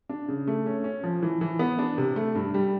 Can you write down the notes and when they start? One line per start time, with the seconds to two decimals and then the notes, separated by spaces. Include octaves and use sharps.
0.09 D4
0.28 C#3
0.48 A3
0.66 C#4
0.84 C#4
1.04 F3
1.22 E3
1.41 E3
1.59 B3
1.79 D4
1.98 C3
2.16 A3
2.35 G2
2.54 G3